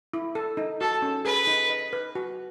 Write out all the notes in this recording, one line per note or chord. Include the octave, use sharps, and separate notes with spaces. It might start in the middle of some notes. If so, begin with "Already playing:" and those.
E4
A4
D#4
F#4 A4
C#4
G#4 B4
D#4
D#5
B4
F#4